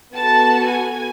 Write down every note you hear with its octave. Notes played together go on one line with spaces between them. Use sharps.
B3 F#4 A4 A5
G#5